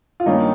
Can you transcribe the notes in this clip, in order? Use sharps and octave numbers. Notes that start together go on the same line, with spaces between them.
F4
G2 D#3 A#3 C#4 D#4